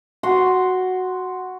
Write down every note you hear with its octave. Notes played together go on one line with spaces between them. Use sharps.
F#4 C6